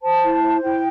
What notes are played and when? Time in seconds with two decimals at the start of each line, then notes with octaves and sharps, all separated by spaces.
0.02 C5 A5
0.22 E4
0.43 C5
0.63 E4 G5